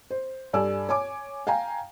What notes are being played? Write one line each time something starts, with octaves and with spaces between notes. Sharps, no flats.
C5
G2 A4 D5 G#5 E6
C#5 G#5 D6
F5 G5 G#5 A#5